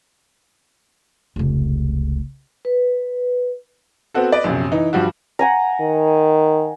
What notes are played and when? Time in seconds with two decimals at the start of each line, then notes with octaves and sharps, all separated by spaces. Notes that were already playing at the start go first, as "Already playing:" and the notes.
1.36 F1 C#2
2.65 B4
4.14 B3 C4 F#4 A4
4.32 B4 D5 D#5
4.44 A#1 F#2 C3
4.72 E3 D#4
4.93 G2 F3 G3 F#4
5.39 F#5 G#5 A#5
5.80 D#3